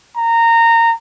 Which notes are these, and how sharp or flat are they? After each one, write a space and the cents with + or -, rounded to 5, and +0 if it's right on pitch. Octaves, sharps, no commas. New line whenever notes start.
A#5 -20